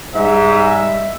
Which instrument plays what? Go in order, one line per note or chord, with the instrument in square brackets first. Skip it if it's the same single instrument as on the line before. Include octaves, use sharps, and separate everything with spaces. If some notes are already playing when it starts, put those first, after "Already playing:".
[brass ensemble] G#2 [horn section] G3 D#5 E5